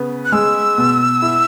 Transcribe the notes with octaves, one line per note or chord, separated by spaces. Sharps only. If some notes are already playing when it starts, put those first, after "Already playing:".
Already playing: C#3 B3
F#6
G#3 E6
B2
E4